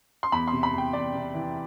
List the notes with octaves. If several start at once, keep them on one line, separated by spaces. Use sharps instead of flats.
C6
E2 B5
C6
C3
B5
E2 G5
E2 D5
C3
E3